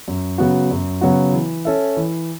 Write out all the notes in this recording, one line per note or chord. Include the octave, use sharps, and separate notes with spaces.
F#2
C#3 F#3 B3 F#4
F#2
C#3 F#3 B3 F#4
E3
C#4 A4 E5
E3